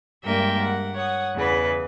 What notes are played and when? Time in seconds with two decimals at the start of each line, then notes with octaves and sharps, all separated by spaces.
0.24 G2 G#3 A#3 A#4 E5 G5
0.63 F#5
0.94 C#5 F#5 D#6
1.34 E2 C#3 E3 B4